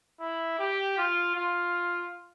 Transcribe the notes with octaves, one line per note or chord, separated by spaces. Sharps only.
E4
G4
F4
F4